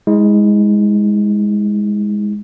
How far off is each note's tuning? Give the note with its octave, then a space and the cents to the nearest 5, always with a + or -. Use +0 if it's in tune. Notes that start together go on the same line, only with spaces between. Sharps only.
G#3 -5 E4 -40